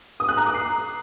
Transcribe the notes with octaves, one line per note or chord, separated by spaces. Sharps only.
D#6
F#6
A#5
D6
C7